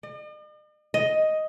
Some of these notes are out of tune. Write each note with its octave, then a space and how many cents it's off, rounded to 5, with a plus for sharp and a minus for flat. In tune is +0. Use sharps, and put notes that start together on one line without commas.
D#5 -45
D#5 +5